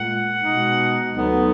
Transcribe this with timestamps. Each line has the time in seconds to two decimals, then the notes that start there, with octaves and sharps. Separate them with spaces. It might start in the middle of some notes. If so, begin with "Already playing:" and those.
Already playing: A#2 G#3 F#5
0.39 B2 G#3 D#4
1.12 D2 D3 F#3 B3 D#4